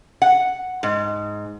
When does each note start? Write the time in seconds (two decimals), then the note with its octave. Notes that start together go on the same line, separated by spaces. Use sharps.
0.22 F#5
0.83 G#2